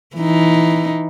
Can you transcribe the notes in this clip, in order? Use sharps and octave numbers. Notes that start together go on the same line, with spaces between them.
E3 D#4